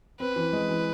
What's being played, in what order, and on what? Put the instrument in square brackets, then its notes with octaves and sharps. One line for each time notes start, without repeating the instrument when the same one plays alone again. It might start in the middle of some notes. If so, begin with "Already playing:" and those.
[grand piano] C4 [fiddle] B4
[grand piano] E3
G#3
E3